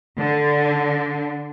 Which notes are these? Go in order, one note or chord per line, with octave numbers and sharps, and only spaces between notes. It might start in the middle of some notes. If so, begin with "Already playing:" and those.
D3